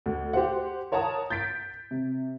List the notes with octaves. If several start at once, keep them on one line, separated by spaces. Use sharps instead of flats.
D2
G4 C5 F#5
A#4 C#5 F#5 A5 A#5 D#6
G6 A6 B6 D7
C3